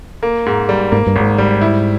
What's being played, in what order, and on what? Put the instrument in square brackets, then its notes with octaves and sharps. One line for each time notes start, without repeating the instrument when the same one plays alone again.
[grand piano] A#3
G#2
G3
[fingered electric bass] G#2 [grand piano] A#3
[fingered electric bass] G2
[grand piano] G#1 [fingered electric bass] G#2
[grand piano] G3
E4